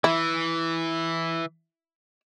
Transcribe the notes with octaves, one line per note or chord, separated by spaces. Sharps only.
E3 E4